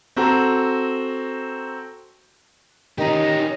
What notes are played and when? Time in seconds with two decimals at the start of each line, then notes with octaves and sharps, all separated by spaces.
0.16 C4 F#4 A4 A#5
2.98 D#3 C#4 D#4 G4 D#5